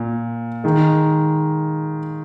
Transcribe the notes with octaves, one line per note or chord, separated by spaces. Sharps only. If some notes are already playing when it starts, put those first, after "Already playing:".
Already playing: A#2
D#3 G#3